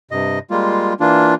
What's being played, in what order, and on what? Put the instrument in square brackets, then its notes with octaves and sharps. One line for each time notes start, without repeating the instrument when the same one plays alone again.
[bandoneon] G2 C3 D#5
G3 G#3 A#3 F4
E3 A#3 D4 F4